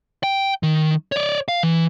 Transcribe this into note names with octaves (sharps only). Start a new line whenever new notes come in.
G5
D#3
C#5 D5
F5
E3